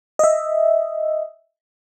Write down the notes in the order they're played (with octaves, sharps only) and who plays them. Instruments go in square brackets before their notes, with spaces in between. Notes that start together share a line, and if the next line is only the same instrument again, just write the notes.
[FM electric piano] D#5 E5